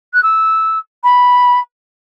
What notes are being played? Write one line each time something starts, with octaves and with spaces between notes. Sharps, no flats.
F#6
E6
B5